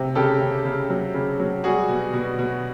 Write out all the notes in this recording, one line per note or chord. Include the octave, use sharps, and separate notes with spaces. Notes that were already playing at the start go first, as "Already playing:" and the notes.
Already playing: C3
C#3 G4 A4
C#3
C#3
F#3
C#3
F#3
G3 F#4 G#4
B2
B2
B2